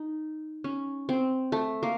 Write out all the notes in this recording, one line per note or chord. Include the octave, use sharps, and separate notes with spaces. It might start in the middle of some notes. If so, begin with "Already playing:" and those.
Already playing: D#4
C#4
C4
A3
A#3